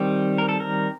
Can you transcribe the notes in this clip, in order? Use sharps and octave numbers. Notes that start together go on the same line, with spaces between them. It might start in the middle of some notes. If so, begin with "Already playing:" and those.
Already playing: D#3 G3 C4 G4
A#4
A4
A#4